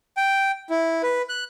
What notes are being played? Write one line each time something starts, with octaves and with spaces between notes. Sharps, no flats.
G5
E4
B4
F#6